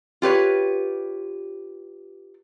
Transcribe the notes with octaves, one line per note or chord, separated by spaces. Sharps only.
F4 G4 B4 C#5